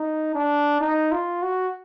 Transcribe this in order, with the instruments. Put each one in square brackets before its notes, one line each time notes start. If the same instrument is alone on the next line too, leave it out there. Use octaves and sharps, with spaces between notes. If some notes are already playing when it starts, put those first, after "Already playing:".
Already playing: [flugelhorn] D#4
D4
D#4
F4
F#4